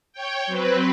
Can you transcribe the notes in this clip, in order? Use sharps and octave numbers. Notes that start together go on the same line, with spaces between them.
C#5 G5
F#3 C4 B4